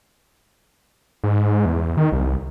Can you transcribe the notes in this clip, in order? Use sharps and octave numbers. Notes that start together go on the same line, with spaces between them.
G#2
E2
D#3
C2